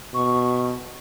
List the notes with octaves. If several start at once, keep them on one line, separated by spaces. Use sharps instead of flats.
B2 C#6